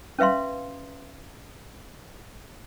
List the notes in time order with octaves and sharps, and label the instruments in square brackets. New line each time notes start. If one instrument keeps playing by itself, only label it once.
[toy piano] C#4 B4 E5 F5 C6